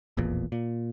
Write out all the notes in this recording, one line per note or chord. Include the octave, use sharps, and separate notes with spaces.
D#1 A1 E2 A#2
A#2